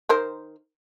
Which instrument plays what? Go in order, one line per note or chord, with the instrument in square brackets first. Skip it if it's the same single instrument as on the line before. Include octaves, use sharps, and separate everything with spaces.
[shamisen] D#3 A#4 C5